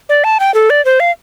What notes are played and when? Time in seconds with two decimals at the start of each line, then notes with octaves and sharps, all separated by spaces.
0.09 D5
0.24 A5
0.40 G5
0.54 A4
0.70 D5
0.85 C5
1.00 F5